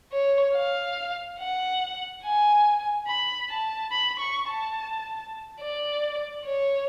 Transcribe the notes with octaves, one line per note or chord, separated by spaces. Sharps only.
C#5
F5
F#5
G#5
B5
A5
B5
C#6
A5
D5
C#5